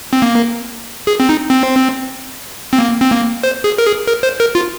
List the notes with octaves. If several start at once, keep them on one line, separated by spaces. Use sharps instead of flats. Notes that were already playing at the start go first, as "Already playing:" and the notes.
C4
A#3
G#4
C4
D#4
C4
C4
A#3
C4
A#3
C5
G#4
A#4
G#4
A#4
C5
A#4
F4